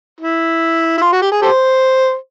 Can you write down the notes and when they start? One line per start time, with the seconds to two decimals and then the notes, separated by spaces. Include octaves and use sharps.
0.21 E4
0.98 E4
1.01 F4
1.13 F#4
1.22 G4
1.32 G#4
1.42 G4 A4 C5